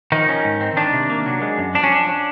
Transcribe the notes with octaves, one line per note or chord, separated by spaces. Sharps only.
D#3 F3 D#4
C#4
G#2
C4
D#3 D4
C3
A#3
F#3
G#3
F#2
F3 D4
C#4
F3 D4
C#4